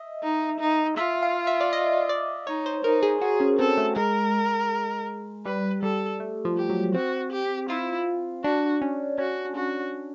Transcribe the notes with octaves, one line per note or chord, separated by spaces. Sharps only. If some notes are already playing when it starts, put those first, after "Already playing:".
Already playing: D#5 E5
D#4
D#4
F4 E5
F5
E5
D5
D#5
D5
D#4 C#5
C5
D#4 A#4
G#4
F#4 G#4
C#4
C4 A4
A3
G#3 A#4
G3 B4
G3 A4
A3
F3
G4
F#3
C4 F#4
G4
E4 F4
D4 F#4
C#4
C#4 F#4
F#4